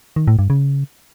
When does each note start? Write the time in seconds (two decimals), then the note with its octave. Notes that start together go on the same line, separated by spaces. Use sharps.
0.16 D#3
0.28 A2
0.39 G2
0.50 C#3